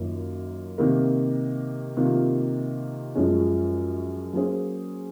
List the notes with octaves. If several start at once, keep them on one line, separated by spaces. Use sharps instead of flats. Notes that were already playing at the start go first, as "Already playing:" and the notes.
Already playing: F#2 D#3 A#3 F4
C3 D#3 A#3
C3 D#3 A#3 F4
F#2 F3 G#3 C#4
F#3 A#3 C#4 G#4 C5